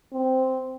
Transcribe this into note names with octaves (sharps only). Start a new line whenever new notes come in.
C4